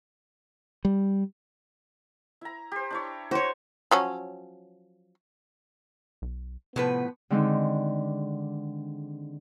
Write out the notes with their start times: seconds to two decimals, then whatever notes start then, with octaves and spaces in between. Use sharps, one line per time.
0.85 G3
2.41 E4 A#5
2.72 G4 C5
2.91 D4 E4 C#5
3.31 F#4 C5 C#5
3.91 F3 F#3 C#4
6.22 B1
6.76 A2 C3 F3 B3 B4
7.30 D3 D#3 G#3 C4 D4 D#4